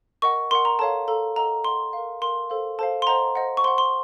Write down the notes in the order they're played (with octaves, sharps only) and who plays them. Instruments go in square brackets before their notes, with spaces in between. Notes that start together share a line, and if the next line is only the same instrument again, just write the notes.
[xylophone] A#4 D#5 F#5 C#6
A#4 D#5 F#5 C6
A#5
A4 C#5 F5 A5
A4 C#5 F5 A#5
A4 D#5 F#5 A#5
A4 D#5 F#5 C6
A#4 F5
A#4 F5 C6
A4 C5 F5
A4 C5 F5 A5
C6
C5 D#5 F#5 A#5
C5 D#5 F#5
C#6
C5 F#5 C6
C6